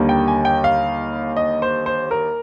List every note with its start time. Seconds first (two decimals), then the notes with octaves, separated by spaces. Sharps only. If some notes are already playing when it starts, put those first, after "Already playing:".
Already playing: D#2 D3 G3 A#3
0.09 G5
0.28 G#5
0.45 G5
0.64 F5
1.37 D#5
1.62 C5
1.86 C5
2.11 A#4